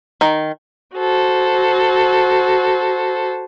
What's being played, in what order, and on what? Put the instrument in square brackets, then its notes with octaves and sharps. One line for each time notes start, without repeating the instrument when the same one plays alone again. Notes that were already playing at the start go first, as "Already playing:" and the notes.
[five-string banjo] D#3
[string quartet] F#4 A4 C5